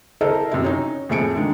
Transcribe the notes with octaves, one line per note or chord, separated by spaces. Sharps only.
E4 A4 A#4 C5 D#5
F#2 C3 E4
C#4 D#4
F2 A2 A3 G#4 C#7 D7
D3 D#3 G#3 A#3